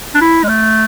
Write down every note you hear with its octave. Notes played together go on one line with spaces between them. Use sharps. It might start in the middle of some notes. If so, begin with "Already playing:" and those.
D4
E4
G#3
A3